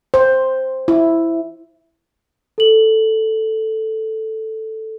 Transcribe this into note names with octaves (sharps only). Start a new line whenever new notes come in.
C5
E4
A4 F#7